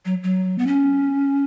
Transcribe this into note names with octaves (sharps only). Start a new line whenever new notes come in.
F#3
F#3
B3
C#4